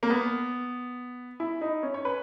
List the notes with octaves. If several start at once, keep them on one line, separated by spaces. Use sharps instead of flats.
A#3
B3
E4
D#4
C#4
C#5
B4